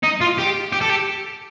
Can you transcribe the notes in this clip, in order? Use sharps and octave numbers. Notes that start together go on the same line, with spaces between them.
D#4
F4
G4
G4
A4
G4